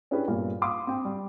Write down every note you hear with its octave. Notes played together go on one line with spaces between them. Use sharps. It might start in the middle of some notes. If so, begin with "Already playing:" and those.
C#4 D4 E4 G4 G#4 B4
G2 A#2 B3
F5 B5 C6 D6 D#6
C4 G5
G3